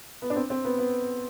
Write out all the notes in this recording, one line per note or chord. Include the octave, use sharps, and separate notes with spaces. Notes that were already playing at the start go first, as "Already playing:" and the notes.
B3
D4
C4
C4
B3
B3